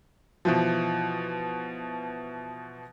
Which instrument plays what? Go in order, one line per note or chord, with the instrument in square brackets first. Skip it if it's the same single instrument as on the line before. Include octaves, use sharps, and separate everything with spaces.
[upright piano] B2 E3 F3